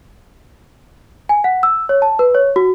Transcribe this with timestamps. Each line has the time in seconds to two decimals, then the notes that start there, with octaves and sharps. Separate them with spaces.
1.29 G#5
1.44 F#5
1.63 E6
1.89 C#5
2.02 A5
2.19 B4
2.35 C#5
2.56 F#4